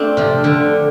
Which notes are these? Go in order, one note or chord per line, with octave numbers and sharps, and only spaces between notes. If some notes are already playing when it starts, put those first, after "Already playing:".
Already playing: A3 C4 D4 F4
C3 F3
D3